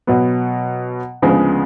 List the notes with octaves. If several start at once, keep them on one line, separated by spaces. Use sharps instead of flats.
B2 F#3 B3
D2 C#3 F3 G#3 B3